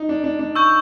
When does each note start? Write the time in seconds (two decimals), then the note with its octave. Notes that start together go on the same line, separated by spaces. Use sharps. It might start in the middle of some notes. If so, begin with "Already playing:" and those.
Already playing: D#4
0.09 D4
0.24 D4
0.39 D4
0.55 C#6 E6 G6